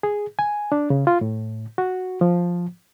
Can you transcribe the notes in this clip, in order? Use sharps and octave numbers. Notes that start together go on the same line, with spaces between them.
G#4
G#5
D4
C#3
F4
A2
F#4
F3